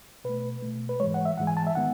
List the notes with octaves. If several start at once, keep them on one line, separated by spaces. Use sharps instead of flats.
B2 A3 B4
B2 A3
B4
G#2 E3 G#3 C#5
F#5
E5
G#2 E3 G#3 F#5
G#5
A5
E5
D#3 G#3 B3 F#5